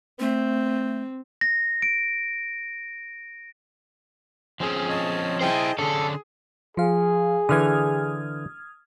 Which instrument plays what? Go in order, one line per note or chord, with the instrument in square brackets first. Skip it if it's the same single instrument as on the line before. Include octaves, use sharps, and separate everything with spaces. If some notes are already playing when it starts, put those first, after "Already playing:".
[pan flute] A3 [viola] C4
[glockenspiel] A#6
D7
[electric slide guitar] F3 C4 C#4 [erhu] G#4
[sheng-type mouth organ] C#5 D#5 A5
[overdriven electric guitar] E4 C5 [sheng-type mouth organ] G#4 D#5 A5 [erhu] G5
[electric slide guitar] D3 C#4 D4 [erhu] G#4 [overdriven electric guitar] A4 [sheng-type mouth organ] C6
[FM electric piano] F3 F5 [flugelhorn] G#4
[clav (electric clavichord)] D3 E3 [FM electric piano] D#6 F6 G#6